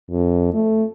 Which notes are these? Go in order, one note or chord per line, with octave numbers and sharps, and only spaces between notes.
F2
A3